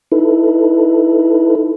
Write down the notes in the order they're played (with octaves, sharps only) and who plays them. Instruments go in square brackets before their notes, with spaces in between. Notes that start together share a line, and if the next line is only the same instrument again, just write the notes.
[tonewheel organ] D#4 E4 A4 B4